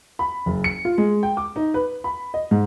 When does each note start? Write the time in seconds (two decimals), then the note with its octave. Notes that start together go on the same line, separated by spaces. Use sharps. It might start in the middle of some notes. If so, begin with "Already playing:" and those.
0.19 B5
0.46 F#1
0.64 C#7
0.85 F4
0.98 G#3
1.23 G5
1.37 D6
1.56 D#4
1.74 B4
2.04 B5
2.34 D#5
2.51 G#2